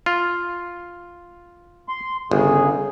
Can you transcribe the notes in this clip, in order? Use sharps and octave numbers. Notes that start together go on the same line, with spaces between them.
F4
C6
G1 C#3 G#4